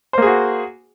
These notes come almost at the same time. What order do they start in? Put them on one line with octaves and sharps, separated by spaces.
C5 A#3 G#4 F#4